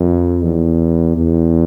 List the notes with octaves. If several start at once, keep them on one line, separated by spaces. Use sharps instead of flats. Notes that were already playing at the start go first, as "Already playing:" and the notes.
Already playing: F2
E2
E2